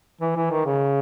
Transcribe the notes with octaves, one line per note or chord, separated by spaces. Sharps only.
E3
E3
D#3
C#3